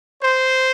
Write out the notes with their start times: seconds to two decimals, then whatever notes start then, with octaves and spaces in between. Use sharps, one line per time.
0.22 C5